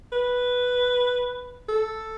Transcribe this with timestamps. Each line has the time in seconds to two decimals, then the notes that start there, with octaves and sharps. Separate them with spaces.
0.13 B4
1.69 A4